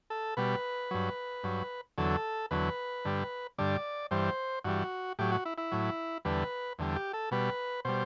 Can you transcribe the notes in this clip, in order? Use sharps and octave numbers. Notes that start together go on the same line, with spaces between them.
A4
B2 G3 B4
G2 F#3
G2 F#3
E2 D3 F#3 A4
E2 D3 F#3 B4
G2 D3 G3
G2 D3 G3 D5
G2 E3 G3 C5
G2 E3 G3 F#4
A2 F#3 G4
F#4
E4
E4
A2 F#3
E2 D3 G3 B4
E2 D3 G3
G4
A4
B2 G3 B4
B2 G3 C5